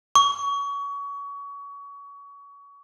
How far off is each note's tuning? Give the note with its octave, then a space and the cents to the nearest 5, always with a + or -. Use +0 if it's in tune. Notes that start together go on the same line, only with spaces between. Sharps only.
C#6 +30